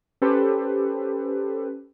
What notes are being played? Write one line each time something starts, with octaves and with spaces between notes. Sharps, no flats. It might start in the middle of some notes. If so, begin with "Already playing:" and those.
C#4 G4 A4 B4 C5